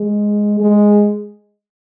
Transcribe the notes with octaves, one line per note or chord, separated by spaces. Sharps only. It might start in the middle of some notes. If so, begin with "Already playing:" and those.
Already playing: G#3
G#3